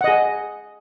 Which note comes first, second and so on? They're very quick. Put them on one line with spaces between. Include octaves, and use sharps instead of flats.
F#5 D#5 G#4